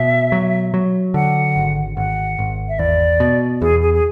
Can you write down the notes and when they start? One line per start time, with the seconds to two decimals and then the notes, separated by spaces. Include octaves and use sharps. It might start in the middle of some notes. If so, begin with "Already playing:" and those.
Already playing: B2 E5
0.32 F#3
0.74 F#3
1.14 D3 F#5
1.56 G#1
1.97 G#1 F#5
2.39 G#1
2.69 E5
2.79 E2 D5
3.20 B2
3.61 E2 G#4
3.82 G#4
3.94 G#4